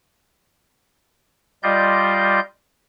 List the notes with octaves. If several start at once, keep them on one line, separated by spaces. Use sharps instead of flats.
G3 F4 D5 D#5 C6 G6